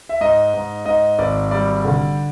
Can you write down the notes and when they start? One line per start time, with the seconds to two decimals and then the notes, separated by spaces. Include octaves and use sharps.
0.09 E5
0.21 G#2 D#5
0.54 G#2
0.86 G#2 D#5
1.18 G#1 D5
1.51 G3 D5
1.85 D3